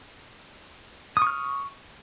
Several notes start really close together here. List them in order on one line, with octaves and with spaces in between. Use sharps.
D#6 C#6 F6